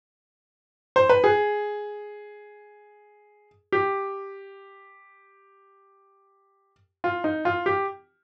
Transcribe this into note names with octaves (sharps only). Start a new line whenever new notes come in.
C5
B4
G#4
G4
F4
D#4
F4
G4